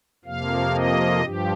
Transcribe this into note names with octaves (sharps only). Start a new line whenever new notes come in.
F2 C3 F3 A#3 F5
D#5
G2 F3 G4